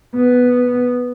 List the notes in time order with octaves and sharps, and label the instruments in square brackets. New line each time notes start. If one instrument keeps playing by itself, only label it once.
[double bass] B3